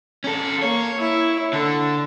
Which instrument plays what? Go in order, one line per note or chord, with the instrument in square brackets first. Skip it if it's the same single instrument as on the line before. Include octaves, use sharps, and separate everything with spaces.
[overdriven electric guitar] C#4 A4
[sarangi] A#3 [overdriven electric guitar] C#5
[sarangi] E4
[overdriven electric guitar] D3 [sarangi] A4